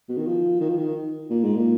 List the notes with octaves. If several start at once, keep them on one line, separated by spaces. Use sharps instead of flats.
B2
D#3
F3
D#3
F3
D#3
A#2
G#2
A#2